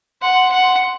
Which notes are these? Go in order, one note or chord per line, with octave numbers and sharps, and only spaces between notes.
F#5 C6
F#5